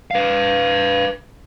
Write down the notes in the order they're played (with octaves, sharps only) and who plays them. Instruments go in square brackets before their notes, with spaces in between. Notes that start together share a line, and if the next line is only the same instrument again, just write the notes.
[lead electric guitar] B4 F5